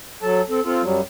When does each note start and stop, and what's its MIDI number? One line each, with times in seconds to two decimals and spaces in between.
0.23 0.41 54
0.23 0.41 69
0.23 0.41 81
0.49 0.60 60
0.49 0.60 69
0.65 0.82 60
0.65 0.82 65
0.65 0.82 69
0.83 1.01 42
0.83 1.01 54
0.83 1.01 55